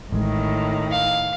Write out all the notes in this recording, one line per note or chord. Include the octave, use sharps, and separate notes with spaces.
A1 A2 D#3 G#3
F5